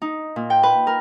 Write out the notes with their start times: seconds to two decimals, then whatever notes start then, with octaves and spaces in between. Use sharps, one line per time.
0.02 D#4
0.36 A#2
0.50 G5
0.63 B4
0.87 A#4